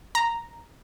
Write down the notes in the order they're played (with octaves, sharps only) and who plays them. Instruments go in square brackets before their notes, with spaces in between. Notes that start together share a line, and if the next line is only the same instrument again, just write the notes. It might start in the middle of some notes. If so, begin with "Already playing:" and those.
[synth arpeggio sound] A#5